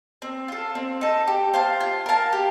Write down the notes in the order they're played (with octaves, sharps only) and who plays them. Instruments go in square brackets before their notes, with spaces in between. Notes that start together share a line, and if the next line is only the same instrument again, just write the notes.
[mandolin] C4
F4 A4
C4
D#4 A4
G4
C5 F5 A5
F4
A#4 F5 A5
G4